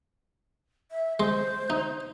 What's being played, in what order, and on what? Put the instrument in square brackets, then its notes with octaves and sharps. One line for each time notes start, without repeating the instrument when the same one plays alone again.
[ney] E5
[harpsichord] G#3 C6 [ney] C5
[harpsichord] D#4